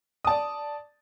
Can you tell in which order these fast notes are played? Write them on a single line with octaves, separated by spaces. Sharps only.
D#6 A5 D5